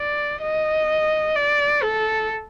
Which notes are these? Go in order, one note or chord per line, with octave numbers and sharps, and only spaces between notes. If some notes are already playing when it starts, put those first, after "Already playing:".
Already playing: D5
D#5
D5
A4